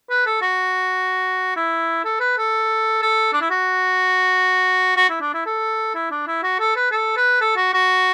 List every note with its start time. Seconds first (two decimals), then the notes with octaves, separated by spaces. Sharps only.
0.10 B4
0.26 A4
0.42 F#4
1.56 E4
2.05 A4
2.20 B4
2.38 A4
3.02 A4
3.33 D4
3.41 E4
3.50 F#4
4.97 F#4
5.10 E4
5.21 D4
5.34 E4
5.46 A4
5.95 E4
6.11 D4
6.27 E4
6.43 F#4
6.60 A4
6.76 B4
6.91 A4
7.17 B4
7.41 A4
7.56 F#4
7.73 F#4